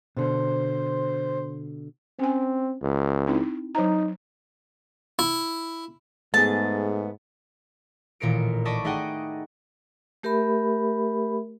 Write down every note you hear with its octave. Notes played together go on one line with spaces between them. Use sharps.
B2 D3 C5
C4 C#4 G#5
C#2
C4 D#4 E4
F#3 D#4 C5 A#5
E4
G#2 A3 B3 G#4 A5
A1 A#2 D#3 A#4 C#7 D7
D5 D#5 A5 B5 C#6 D6
A3 D#4 G#4 D#5 F#5 G5
A3 G4 A#4 E5 B5